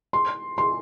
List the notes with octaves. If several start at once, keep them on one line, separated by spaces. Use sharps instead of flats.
C6
C6